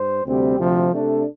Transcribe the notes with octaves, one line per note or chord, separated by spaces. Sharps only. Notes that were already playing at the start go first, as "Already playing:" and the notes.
Already playing: G2 C5
D2 C3 G3 C4 G4
D2 C3 F3
C3 A3 D4 A4